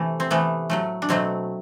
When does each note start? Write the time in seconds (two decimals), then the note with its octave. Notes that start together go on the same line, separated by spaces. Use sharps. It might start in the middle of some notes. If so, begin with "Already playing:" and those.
Already playing: C3 E3 A3
0.20 C4
0.30 C3 E3 A3 B3
0.70 A2 F#3 A3
1.02 D4
1.09 B2 F#3 A3 C4